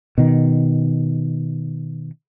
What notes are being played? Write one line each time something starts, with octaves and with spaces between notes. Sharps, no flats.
B2 D#3